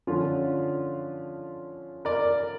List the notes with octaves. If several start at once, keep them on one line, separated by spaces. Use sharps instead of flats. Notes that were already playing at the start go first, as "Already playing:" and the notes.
D3 F3 C#4 F4
A#4 D5